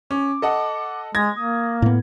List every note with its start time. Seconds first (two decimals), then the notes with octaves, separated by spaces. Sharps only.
0.11 C#4 D6
0.42 A4 D#5 F#5
1.15 G#3 G#6 A#6
1.36 A#3 D#6
1.82 A2 B3